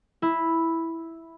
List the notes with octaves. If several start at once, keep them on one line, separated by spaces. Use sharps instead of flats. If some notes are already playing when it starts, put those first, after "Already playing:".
E4